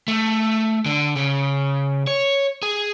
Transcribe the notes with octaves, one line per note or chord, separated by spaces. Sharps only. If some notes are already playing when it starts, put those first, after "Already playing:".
A3
D3
C#3
C#5
G#4